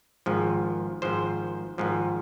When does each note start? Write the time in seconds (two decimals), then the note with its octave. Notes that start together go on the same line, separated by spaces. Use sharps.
0.26 G#1 G#2 F3
1.02 G#1 G#2 F3 C5
1.78 G#1 G#2 F3